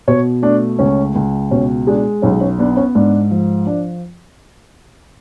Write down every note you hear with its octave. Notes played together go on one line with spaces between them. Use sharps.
B2 C#5
A3 D4
C#2 C#4
C#2
B2 C#4
G#3 D4
B1 C#4
C#4
B3 D4
C#4
G#2 D4
F3
D4